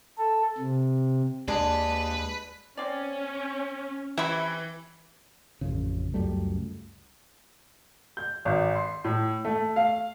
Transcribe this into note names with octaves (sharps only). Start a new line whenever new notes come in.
A4
C3
D#2 G#3 D4 B4
C4 C#4 D5
C3 E3 E4 E5 B5 C#6
A1 F2 C#3
C#2 F#2 G3 A3
G6
G#1
C6
A2
A3
F5